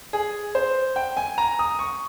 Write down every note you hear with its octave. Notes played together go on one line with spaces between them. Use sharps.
G#4
C5
G5
G#5
A#5
D#6
C#6